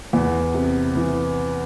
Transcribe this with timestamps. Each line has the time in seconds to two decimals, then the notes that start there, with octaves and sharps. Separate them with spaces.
0.13 E2 B3
0.54 C3
0.95 E3